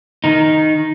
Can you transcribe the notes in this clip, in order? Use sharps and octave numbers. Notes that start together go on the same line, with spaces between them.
D#3 D#4